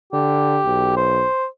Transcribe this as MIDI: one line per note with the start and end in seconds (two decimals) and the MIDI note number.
0.13 0.60 50
0.13 0.96 67
0.65 1.24 35
0.97 1.46 72